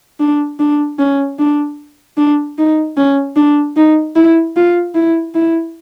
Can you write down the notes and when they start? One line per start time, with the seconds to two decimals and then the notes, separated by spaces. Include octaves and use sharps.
0.20 D4
0.59 D4
0.99 C#4
1.39 D4
2.17 D4
2.58 D#4
2.96 C#4
3.36 D4
3.76 D#4
4.16 E4
4.56 F4
4.95 E4
5.35 E4